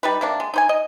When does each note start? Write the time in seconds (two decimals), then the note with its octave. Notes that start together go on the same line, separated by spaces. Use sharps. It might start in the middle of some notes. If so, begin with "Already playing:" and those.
0.03 G3 D#4 B4
0.21 C3 A#3 D4
0.40 G#3
0.54 D#4 C5 G#5
0.69 D#5